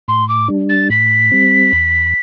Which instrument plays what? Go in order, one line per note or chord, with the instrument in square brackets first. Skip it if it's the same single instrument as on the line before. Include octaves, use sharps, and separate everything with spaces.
[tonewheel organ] A2 [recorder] C6
[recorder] D6
[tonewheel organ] G3 D4
[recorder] A6
[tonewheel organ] A2 [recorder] B6
[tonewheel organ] G3 C4
E2